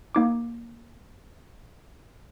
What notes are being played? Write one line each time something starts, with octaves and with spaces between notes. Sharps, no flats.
A#3 D#4 D6